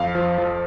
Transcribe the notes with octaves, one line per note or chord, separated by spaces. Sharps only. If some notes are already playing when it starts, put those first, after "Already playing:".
Already playing: F2 F5
F3
F3